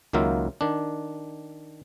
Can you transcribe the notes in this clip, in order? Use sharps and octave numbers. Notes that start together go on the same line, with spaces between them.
C#2 D#3 F#3 A#3 F4 E5
D#3 D4